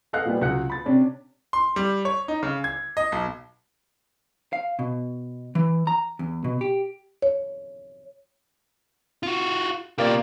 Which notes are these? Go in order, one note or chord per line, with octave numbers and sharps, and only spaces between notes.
A4 D#5 F5 F#5 F#6
A#2 F3 G3 B3
C#2 F#3 F#5 F#6 C#7
B5 A6
C3 C#4 D4
C6
G3
C#5
D#4
C#3
G#6
D#5
B1
F5
B2
E3
A#5
E2
B2
G4
C#5
F4 F#4
B2 A#3 F4 G4 D5